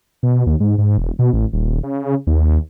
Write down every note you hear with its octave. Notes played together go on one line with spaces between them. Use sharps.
B2
D#2
G#2
G#2
E1
B2
A1
D#1
C#3
D#2